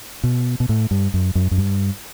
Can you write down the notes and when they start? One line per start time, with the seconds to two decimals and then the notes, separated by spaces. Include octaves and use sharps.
0.23 B2
0.60 B2
0.69 A2
0.91 G2
1.14 F#2
1.35 F#2
1.51 F#2
1.58 G2